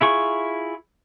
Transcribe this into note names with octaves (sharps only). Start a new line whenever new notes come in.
E4 F4 G#4 C#6